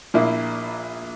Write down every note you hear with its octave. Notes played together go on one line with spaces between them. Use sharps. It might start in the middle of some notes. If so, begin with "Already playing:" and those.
A#1 A#2 A#3 E4